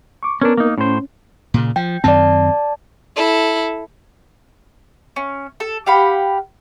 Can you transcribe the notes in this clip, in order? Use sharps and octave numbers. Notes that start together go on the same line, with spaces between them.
C#6 D6
B3 C#4 D4 A#4
A#3 D#4
A2 C#4 C5
A#2 C#3
F3 G5
F#2 D#3 C4 D5 A5
E4 A4
C#4
A4
G4 F5 F#5 B5